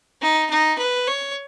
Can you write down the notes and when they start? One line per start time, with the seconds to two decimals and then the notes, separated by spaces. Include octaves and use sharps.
0.22 D#4
0.50 D#4
0.78 B4
1.07 C#5